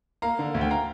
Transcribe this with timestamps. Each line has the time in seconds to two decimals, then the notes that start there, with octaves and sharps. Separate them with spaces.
0.22 A#3 F5 A#5
0.39 D3
0.54 D2
0.61 G5
0.70 F5 A#5